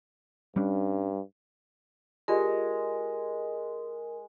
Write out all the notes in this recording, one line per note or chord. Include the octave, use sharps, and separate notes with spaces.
G2 G3 C#4 D4
G#3 F4 G4 A#4 D5